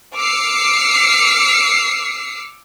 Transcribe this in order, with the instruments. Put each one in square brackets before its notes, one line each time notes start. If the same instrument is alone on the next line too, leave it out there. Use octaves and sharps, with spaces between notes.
[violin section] D6 E6 F6 C7 C#7